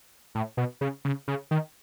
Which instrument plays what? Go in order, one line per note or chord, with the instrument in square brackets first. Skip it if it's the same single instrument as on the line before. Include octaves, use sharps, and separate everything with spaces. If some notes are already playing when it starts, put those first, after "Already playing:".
[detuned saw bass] A2
B2
C#3
C#3
C#3
D#3